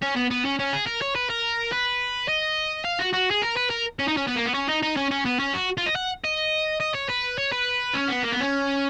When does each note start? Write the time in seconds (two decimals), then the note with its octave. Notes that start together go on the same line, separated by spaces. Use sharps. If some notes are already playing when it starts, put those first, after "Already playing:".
0.02 C#4
0.16 B3
0.31 B3
0.45 C#4
0.59 C#4
0.73 G#4
0.87 A#4
1.02 C#5
1.15 B4
1.30 A#4
1.72 B4
2.28 D#5
2.85 F5
3.00 F#4
3.13 F#4
3.31 G#4
3.42 A#4
3.56 B4
3.70 A#4
3.99 C#4
4.08 D#4
4.17 C#4
4.27 B3
4.36 A#3
4.46 B3
4.54 C#4
4.69 D#4
4.83 D#4
4.97 C#4
5.11 C#4
5.25 B3
5.39 C#4
5.54 F#4
5.77 F4
5.86 D#5
5.96 F#5
6.25 D#5
6.81 D#5
6.95 C#5
7.10 B4
7.38 C#5
7.52 B4
7.94 C#4
8.08 B3
8.23 A#3
8.32 B3
8.41 C#4